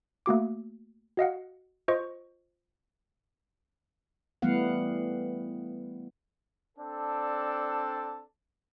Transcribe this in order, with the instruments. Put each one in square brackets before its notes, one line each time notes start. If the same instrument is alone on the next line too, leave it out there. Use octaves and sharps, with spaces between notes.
[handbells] A3 A#3 F#4 D6
F#4 D#5 F5 F#5
F4 C5 D#5 C#6
[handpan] E3 G3 A3 B3 F5 F#5
[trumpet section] C4 D4 A4 D5 A5